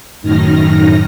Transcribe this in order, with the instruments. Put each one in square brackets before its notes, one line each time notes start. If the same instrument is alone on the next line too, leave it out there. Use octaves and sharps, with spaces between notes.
[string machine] F#2 A2 D#3 D#4 F6 A#6